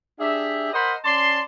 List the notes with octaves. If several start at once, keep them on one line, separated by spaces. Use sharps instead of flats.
D4 G4 G#4 E5
A#4 C5 D#5 F#5 B5
C#4 D5 A5 C6